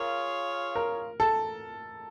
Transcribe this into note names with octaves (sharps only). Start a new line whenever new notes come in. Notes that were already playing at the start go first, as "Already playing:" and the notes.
Already playing: F4 G#4 A#4 C#5 F5
A#4
A4